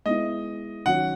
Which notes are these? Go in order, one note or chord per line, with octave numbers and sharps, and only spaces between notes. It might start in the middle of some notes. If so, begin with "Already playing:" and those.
G#3 B3 E4 D#5
D#3 F#3 C#4 F#5